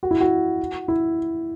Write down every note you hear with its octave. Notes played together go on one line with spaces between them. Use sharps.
F#4
E4
F#4
E4